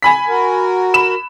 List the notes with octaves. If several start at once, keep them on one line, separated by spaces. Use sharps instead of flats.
G#5 B5 B6
F#4 A#4
B5 E7